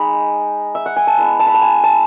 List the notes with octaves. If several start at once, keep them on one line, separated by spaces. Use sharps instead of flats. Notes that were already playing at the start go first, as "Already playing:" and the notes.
Already playing: G#3 D#4 B5
E5
F#5
G#5
A5
G#3 B3 E4 B5
A5
B5
A5
G#5
A5